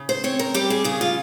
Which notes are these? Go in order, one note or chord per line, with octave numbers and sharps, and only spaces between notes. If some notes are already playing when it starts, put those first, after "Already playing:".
Already playing: C#3
C5
C4 C#5
A#4
G3 G4
G#4
C#3 G#4
F4